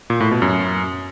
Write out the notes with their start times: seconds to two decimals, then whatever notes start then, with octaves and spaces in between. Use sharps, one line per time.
0.10 A#2
0.20 A2
0.31 B2
0.42 F#2